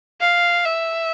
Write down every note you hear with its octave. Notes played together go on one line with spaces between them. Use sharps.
F5
E5